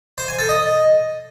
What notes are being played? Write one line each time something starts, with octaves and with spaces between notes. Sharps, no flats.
C5
G#5
A4
D#5